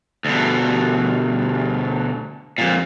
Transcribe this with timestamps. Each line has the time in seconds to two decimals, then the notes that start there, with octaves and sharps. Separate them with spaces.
0.25 D2 B2
2.58 F2 A#2